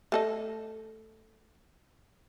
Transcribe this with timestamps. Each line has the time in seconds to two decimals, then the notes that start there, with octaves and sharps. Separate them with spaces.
0.12 A3 A4 D#5